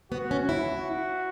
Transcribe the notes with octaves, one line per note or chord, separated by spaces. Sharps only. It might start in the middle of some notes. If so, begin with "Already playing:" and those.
B3 F#4
C#4
E4
F#4